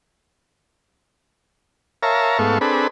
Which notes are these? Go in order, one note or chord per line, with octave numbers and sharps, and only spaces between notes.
A#4 C#5 E5 F5 A5 A#5
G#2 A3 B3 A4 F5 C#6
C4 D4 G#4 A4 B4 B5